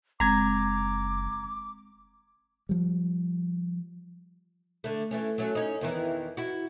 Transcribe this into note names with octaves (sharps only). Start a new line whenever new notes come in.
F#1 G#3 C4 A#5 D6 G#6
F3 G3
D3 A3
E3 A3 C#4
F#3 A3 C#4
C#4 D#4
E2 D#3 E3
E4 F#4